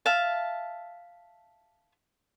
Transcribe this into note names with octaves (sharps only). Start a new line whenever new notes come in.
E5 F5 A5